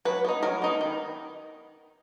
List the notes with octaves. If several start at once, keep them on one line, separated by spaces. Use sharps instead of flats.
F#3 B4
B3 D#4
F#3 A#4
B3 D#4
D#3